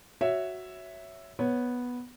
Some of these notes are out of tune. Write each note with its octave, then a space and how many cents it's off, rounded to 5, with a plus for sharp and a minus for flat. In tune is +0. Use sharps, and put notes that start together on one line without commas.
F#4 +0 C#5 +0 E5 +0
B3 -5 C#5 -5